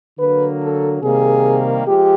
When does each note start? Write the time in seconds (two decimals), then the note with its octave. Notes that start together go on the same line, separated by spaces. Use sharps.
0.18 D3 F#3 A#3 B4
0.60 A4
1.02 C3 D#3 G3 A#3 G#4
1.86 F3 G#3 G4